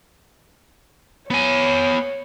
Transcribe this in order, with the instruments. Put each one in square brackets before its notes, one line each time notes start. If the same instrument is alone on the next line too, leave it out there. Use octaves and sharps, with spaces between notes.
[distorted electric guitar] B3 G#5 [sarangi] C#5